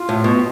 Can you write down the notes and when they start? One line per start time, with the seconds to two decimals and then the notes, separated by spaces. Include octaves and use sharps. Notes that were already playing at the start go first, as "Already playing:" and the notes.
Already playing: F4
0.09 A2
0.24 B2